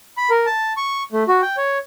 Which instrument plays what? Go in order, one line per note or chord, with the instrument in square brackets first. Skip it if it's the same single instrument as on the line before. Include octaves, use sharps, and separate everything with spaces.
[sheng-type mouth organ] B5
A#4
A5
C#6
A3
F#4
G5
C#5